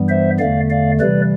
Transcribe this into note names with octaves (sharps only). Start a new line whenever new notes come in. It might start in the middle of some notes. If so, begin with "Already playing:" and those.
Already playing: G2 E3 G3 B3
C5 E5
E2 D3 A3 D5 F5
D5 F5
C3 E3 G3 B4 D5